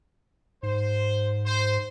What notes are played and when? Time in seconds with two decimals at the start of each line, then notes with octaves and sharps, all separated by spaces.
0.63 G#2 C5
1.45 C5